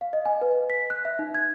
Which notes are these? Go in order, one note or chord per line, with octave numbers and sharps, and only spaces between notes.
F5
D#5
G#5
B4
B6
F#6
E5
D#4
G#6